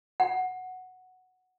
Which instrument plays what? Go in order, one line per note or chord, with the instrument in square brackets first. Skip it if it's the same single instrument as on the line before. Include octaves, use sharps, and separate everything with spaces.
[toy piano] F#5